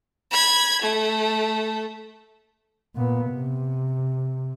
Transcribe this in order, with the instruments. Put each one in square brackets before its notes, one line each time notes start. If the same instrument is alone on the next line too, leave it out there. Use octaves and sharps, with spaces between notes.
[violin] B5 G#6
A3
[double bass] A#2 B3
C3